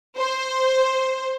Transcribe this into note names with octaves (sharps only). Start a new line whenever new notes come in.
C5